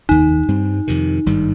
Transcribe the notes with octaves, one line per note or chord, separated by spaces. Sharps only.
F1 D#2 D#3 D#4
G2 G3 C4
F2 C3 D#3
G#1 G2 D#3 G3